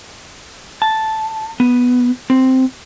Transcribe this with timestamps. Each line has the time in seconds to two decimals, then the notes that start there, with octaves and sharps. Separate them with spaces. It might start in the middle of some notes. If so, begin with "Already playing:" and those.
0.82 A5
1.60 B3
2.30 C4